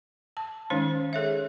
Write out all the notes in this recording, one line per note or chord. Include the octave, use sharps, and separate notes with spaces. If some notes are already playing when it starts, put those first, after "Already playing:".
A5
D#3 G#3 C#4 D#4 C5
G#4 A4 C#5 E5